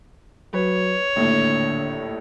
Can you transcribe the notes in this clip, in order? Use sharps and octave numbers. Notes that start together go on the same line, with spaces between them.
F#3 B4 C#5
A#1 D#2 A2 D3